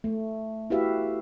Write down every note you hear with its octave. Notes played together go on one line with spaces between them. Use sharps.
A3
E4 F#4 G4 B4 E5 F5